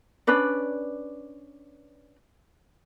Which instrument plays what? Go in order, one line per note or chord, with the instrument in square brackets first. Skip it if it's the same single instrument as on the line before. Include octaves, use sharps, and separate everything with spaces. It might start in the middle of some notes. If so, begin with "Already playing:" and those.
[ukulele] C#4 D4 B4 D5